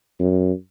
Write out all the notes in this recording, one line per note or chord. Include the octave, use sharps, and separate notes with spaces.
F#2